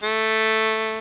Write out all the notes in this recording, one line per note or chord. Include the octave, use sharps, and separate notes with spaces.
A3